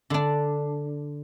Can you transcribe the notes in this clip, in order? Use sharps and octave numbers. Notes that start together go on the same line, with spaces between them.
D3 D4